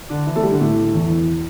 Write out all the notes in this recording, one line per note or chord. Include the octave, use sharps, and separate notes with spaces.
D3 D4
E3 E4
A3 A4
G3 G4
D3 D4
A2 A3
E2 E3